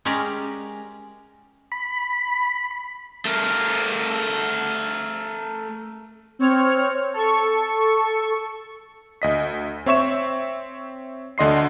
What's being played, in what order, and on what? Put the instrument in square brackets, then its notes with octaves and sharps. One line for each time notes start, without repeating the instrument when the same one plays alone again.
[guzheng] G#3 C#4 G4 A#4 D5
[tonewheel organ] B5
[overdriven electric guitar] A3 A#4
[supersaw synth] C4 C#5 F6
A4 C#6
[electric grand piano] D2 D#5 B6
C4 C#5 E5 C#6 E7
D2 D3 D#5 C6 C7